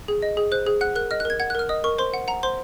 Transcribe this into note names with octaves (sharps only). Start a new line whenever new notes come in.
G#4
D#5
G#4
C5 F#6
G#4
F#5 F#6
A#4 F#6
D#5 F6
F#6
A#4 G#6
F#5 G#6
F#6
A#4 F6
D#5 D#6
A#4 C#6
C5 C6
F#5
F#5 A#5
C5 C6